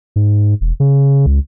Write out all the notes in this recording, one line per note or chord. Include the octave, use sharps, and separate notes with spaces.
G#2
E1
C#3
C#2